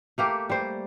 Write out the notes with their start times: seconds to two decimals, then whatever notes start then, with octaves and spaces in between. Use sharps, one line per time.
0.18 A3 A#3 G4
0.50 G3 C5